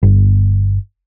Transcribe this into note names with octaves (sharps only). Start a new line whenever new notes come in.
G1